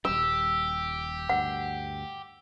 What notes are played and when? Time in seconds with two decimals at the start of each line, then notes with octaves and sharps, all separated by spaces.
0.05 D#1 G3 G4 E6
1.29 D2 G2 F#5